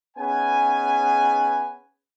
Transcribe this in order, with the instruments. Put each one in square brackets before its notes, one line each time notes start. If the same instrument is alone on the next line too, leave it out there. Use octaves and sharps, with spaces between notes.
[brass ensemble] B3 C#4 D#4 G#4 B4 G#5